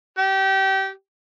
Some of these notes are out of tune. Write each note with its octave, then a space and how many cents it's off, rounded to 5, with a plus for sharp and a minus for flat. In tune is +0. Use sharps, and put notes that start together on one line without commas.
G4 -25